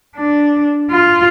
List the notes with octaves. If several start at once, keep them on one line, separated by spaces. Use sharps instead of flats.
D4
F4